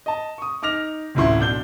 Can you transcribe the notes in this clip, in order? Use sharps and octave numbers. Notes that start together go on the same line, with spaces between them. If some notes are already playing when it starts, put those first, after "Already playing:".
D#5 A5
C#6 D#6
D#4 D6 F6 A#6 F7
D1 A1 D2 E4 C6
B1 D4 G6 G7